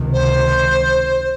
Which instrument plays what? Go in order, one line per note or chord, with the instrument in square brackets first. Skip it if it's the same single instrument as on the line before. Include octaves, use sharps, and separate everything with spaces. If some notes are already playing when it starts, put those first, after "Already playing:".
Already playing: [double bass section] C#2 C3 D#3
[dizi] C5